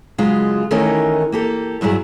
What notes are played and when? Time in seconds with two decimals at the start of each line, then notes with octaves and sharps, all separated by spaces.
0.18 C#3 F#3 G#3 F4
0.71 D#3 E3 A3 C#4 D#4 A#4
1.32 A#3 G4 A4
1.81 E2 G2 F#3 E4 G#4